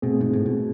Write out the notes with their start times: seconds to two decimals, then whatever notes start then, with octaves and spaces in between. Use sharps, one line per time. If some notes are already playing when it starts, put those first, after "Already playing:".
0.02 B2 A3 C4 G#4
0.21 G#2
0.33 A2
0.46 B2